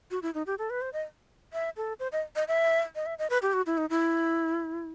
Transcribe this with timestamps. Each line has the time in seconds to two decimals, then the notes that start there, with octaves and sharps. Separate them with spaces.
0.11 F#4
0.22 E4
0.34 D#4
0.47 G4
0.58 A4
0.70 B4
0.81 C5
0.93 D#5
1.53 E5
1.77 A4
2.00 C5
2.12 D#5
2.36 D#5
2.48 E5
2.95 D#5
3.06 E5
3.19 D#5
3.30 B4
3.42 G4
3.53 F#4
3.66 E4
3.78 D#4
3.90 E4